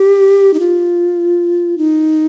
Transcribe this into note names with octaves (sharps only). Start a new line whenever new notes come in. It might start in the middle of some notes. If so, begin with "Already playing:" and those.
Already playing: G4
D#4
F4
D#4